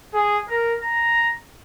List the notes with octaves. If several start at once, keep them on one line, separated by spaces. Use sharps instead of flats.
G#4
A#4
A#5